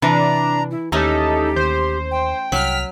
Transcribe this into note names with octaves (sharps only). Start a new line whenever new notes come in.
C3 E3 D4 A#5
E4
D#2 A3 C#4 D#4 G4 A4
D#2 C5
G5
C2 F#3 F6 B6